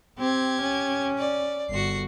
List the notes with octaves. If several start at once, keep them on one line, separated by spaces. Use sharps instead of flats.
C4 G4 G#6
C#4
D5
G1 F#4 C7